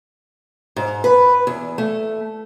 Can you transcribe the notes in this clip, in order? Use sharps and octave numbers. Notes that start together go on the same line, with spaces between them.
G#2
B4
E2
A3